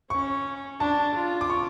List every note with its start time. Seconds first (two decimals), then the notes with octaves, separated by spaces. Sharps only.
0.10 C#4 C#6
0.80 D4 A5
1.15 F4
1.41 D6
1.50 C#6